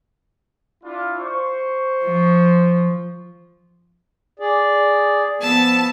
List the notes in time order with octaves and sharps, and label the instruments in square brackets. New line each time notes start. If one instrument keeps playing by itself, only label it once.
[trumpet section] D4 E4 F4
C5 C#6
[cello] F3
[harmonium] G#4 D5
[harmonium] F3 [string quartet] B3 A5 E6